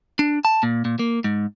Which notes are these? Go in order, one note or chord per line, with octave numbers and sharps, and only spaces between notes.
D4
A5
A#2
A#2
A#3
G#2